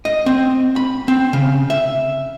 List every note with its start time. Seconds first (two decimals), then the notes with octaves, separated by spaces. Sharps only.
0.05 D#5
0.26 C4
0.76 B5
1.08 C4
1.33 C#3
1.70 E5